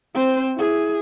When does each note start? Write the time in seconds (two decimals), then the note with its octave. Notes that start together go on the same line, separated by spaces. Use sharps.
0.14 C4 C5
0.55 E4 G#4